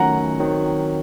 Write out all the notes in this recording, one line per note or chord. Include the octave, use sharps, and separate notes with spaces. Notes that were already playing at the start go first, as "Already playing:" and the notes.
Already playing: D#3 F#3 A3 C#4 F#5 A#5
D#3 F#3 C4